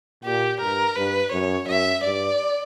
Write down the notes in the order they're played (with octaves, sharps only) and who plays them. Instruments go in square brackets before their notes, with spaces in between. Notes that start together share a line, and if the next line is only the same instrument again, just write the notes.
[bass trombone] A#2 [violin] G4
[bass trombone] G2 [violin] A#4
[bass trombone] G2 [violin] B4
[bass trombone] F#2 [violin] C#5
[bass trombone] F#2 [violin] E5
[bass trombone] G2 [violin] D5